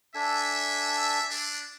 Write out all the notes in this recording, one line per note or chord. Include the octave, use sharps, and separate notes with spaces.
D4 A4 E5 G#5
D4